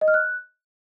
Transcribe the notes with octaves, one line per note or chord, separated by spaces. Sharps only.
D#5
F6
F#6